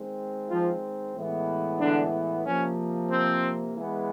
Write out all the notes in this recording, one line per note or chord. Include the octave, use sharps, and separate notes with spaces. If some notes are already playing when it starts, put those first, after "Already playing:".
Already playing: D#3 G#3 C4
F3 F4
A2 E3 G#3 B3
D3 D4
C3 F3 A#3 C#4
C4
E3 G#3 B3